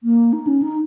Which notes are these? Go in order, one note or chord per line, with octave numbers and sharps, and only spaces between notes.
A#3
D#4
C#4
D#4